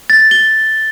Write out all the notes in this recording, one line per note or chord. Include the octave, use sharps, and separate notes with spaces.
A6
G7